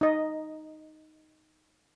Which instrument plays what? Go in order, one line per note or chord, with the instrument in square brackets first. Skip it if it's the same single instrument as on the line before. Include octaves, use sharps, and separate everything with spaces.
[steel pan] D#4 D#5